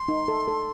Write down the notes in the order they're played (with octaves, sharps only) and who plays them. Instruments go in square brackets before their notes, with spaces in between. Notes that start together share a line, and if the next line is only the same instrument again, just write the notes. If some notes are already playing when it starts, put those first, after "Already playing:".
Already playing: [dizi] C6
[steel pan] D#4
A4
A4